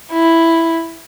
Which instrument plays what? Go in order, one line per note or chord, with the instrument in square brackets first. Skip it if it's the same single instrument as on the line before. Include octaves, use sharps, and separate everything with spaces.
[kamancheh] E4